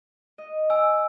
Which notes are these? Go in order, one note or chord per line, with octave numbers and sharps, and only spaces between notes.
D#5
G#5 E6